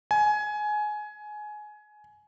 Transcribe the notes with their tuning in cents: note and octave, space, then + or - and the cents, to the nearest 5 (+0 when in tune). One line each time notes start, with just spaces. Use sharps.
G#5 +20